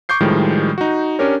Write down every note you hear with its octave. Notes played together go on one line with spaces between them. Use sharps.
C#6 D6 G6 C7
A2 D#3 F3 G3 G#3
D#4 F#4
C#4 D4 G4 A#4 C#5